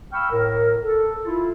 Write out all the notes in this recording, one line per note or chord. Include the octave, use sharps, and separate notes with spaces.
F5 G5 B5 C#6 E6 F6
A2 A#4
A4
E4 F4